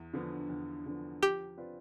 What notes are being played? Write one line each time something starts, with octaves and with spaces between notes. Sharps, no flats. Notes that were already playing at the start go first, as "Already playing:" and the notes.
Already playing: E2
D3 F3 B3
E2
D3 F3 B3
F3 G4
C4 F4 B4 D5